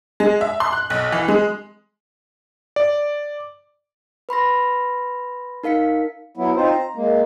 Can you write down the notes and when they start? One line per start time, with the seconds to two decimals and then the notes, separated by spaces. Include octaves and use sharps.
0.20 G#3
0.41 E5
0.60 C6
0.72 F#6
0.90 B1
1.12 E3
1.28 G#3
2.76 D5
4.29 B4 B5 C6 A#6
5.64 D#4 A#4 F5 B6 C#7
6.37 F#3 B3 E4
6.56 C4 D#4 F4 C5
6.70 A#5
6.96 G#3 A#3